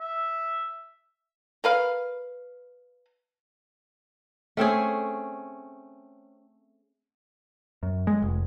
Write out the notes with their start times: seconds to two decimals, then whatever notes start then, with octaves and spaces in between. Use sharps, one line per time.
0.01 E5
1.64 A#4 B4 F5
4.57 A3 C4 C#4 G#4
7.83 F#2
8.07 G#3
8.22 F1